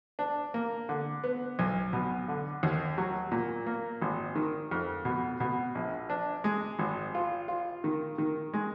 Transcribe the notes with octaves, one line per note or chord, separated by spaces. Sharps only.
D4
A#3
D3
B3
B1
B2
D3
D#2
F#3
A#2
A#3
G#1
D#3
F2
B2
B2
A#1
D4
G#3
G#1
F4
F4
D#3
D#3
G#3